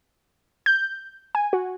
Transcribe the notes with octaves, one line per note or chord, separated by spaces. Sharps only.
G6
G#5
F#4